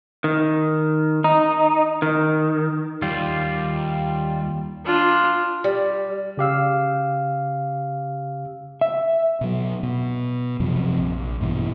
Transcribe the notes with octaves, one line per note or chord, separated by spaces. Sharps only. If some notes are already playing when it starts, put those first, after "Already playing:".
D#3
D#4
D#3
D#2 G3 F4
D4 F4
G3
C#3 G4 F5 E6
E5
B2 F#3
B2
F#2 C3 F3
A#1
G2 B2 E3